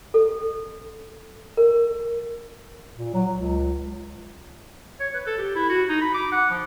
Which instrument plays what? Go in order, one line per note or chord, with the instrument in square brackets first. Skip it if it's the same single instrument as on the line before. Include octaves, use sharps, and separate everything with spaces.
[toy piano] A4
A#4
[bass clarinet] A#2
F#3
C#2
[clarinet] C#5
B4
A4
G4
E4
F#4
D#4
B5
D6
F#5
F3